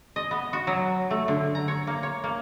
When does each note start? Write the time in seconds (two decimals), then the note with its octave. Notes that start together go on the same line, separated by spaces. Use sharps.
0.16 D#5
0.31 B3
0.53 F#4
0.67 F#3
1.11 A3
1.28 D3
1.55 A#5
1.68 C#5
1.87 A#3
2.03 C#5
2.24 A#3